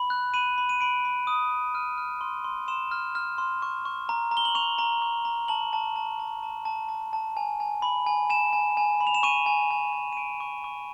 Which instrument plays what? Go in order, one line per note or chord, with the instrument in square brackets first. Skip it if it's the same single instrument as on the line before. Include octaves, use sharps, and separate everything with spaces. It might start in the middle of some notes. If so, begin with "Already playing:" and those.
Already playing: [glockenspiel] B5
F#6
B5 D#7
B5
D#7
B5 D7
B5
D#6
D#6
F6 D#7
F6
C6
C6
C6 E7
F6
F6
C6
C#6
C#6
A#5
A#5
G7
F#7
C#6 F7
A#5
C#6
A#5
A5 F#7
A5
A5
A5
A5
A5
A5
A5
G#5
G#5
B5
G#5
G#5 E7
G#5
G#5
B5
F7
E7
C#6 D#7
G#5
G#5
G#5
D#7
C#6 D7
C#6
C#6